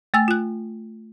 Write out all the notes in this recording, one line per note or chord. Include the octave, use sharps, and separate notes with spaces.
A3 G#5 E6 A6
F4 F#6